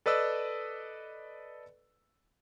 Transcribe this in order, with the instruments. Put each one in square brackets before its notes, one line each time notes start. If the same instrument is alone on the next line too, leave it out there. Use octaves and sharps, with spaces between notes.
[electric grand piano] A4 B4 D5 D#5 E6